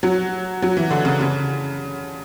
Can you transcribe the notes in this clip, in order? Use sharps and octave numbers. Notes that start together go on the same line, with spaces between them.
F#3
F#3
E3
D3
C#3
C#3